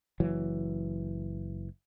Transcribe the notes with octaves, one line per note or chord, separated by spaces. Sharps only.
F#1 E3 F#3